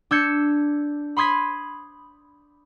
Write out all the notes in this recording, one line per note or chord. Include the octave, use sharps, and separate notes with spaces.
D4 E6 G6 G#6 C#7
B5 C6 D#6 G#6 B6